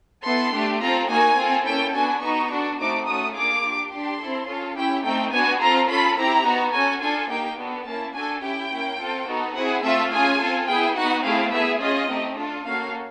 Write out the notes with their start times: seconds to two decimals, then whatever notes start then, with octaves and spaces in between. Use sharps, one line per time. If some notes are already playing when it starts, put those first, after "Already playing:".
0.24 B3 E4 A4 C6
0.53 A3 D4 G4
0.81 C4 F4 A4 A#5
1.09 A#3 D#4 F#4 G#5
1.37 C4 F4 A4
1.65 A#3 C#4 E4 A4 G5
1.94 B3 D4 F#4 G#5
2.21 B3 D#4 F#4 C#6
2.50 D4 F#4 A4
2.79 A3 C4 D#4 F#4 A4 D6
3.06 A3 C#4 F#4 A4 D#6
3.34 A#3 D4 F4 G#4 D6
3.63 D4 G4
3.91 D4 G4 C6
4.19 C4 E4 A4
4.47 C#4 F4 A4
4.76 C#4 E4 G4 G5
5.04 A3 C4 D#4 G5
5.32 B3 D4 F#4 G#5
5.60 C4 F4 A4 A#5
5.89 C#4 F4 A4 B5
6.17 C4 E4 G4 A#5
6.45 B3 D#4 F#4
6.73 C#4 F#4 A4 G#5
7.01 D4 F4 A4 G#5
7.29 A#3 D#4 G4 G5
7.58 B3 D4 F#4 A4
7.85 A#3 C#4 E4 A5
8.14 D4 F#4 A4 G#5
8.42 C#4 E4 G4 G5
8.71 A#3 C#4 E4
8.99 C4 F4 A4
9.26 B3 D#4 F#4 A4
9.55 C4 E4 G#4 F#5
9.83 A3 C4 F4 A4 E5
10.12 C#4 F4 G#4 G#5
10.39 C4 F4 A4
10.67 B3 E4 G#4 G5
10.96 B3 D#4 F#4 F#5
11.24 A3 C4 E4 G#4 F5
11.52 B3 E4 G#4 E5
11.81 C#4 F4 G#4 D#5
12.08 A3 C4 D#4 G4
12.37 D4 F4 A4
12.65 A#3 C#4 F#4 A4 F5